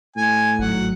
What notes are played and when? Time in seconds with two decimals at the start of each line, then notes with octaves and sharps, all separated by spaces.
0.16 A2 G#5
0.59 G#1 F#3 F#5